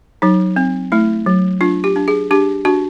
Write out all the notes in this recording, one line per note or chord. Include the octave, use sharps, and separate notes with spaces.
F#3 D#4
C4
A3 E4
F#3
D4 F4
G4
D4
G#4
D4 G4
D4 F#4